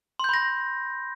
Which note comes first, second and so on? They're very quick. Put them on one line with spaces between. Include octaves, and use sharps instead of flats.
C6 G6 B5 A#6